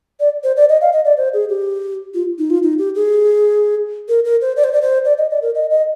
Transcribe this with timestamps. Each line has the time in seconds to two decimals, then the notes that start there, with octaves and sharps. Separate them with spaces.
0.20 D5
0.44 C5
0.57 D5
0.69 D#5
0.81 F5
0.93 D#5
1.05 D5
1.17 C5
1.34 G#4
1.49 G4
2.14 F4
2.38 D#4
2.50 F4
2.63 D#4
2.78 G4
2.95 G#4
4.09 A#4
4.25 A#4
4.41 C5
4.57 D5
4.64 C5
4.73 D5
4.82 C5
5.05 D5
5.18 D#5
5.31 D5
5.42 A#4
5.55 D#5
5.70 D#5